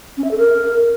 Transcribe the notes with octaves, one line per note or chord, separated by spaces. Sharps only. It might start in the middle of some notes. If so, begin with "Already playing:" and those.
C#4
E5
A4
A#4